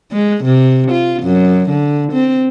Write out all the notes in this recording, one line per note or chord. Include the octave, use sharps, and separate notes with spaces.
G#3
C3
F4
F#2
D3
C4